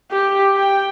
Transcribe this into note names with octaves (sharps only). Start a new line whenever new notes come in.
G4
G5